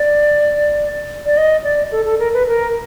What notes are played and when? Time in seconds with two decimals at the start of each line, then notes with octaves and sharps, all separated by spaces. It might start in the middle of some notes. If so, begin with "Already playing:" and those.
Already playing: D5
1.25 D5
1.37 D#5
1.64 D5
1.92 A4
2.06 A4
2.19 A#4
2.34 B4
2.48 A#4